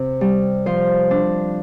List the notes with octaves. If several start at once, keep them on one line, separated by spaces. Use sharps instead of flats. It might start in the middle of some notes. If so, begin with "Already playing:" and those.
Already playing: C3 C4
G3
F3 C5
D4